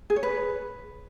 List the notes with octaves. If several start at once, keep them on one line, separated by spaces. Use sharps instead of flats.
G#4
C#5
B4